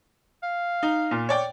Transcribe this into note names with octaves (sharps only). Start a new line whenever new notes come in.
F5
D#4
A#2
C#5 D5 G5